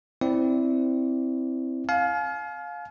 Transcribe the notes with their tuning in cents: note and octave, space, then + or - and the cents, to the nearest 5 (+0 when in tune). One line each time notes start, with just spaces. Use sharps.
C4 +0 E4 -5 D5 -15
F5 +15 G#5 +45